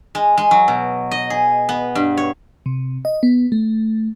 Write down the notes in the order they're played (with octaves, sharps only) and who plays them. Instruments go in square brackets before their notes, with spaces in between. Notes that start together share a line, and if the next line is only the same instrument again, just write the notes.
[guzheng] G#3
G#3
F#3
B2
D#5
G#4
B3
G2
C#5
[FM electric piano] C3
D#5
B3
A3